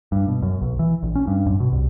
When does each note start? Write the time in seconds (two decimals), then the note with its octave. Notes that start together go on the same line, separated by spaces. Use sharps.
0.12 G2
0.28 B2
0.42 F#2
0.61 B1
0.79 E3
1.03 A#1
1.15 C#4
1.27 G2
1.46 F#2
1.60 B2
1.72 C2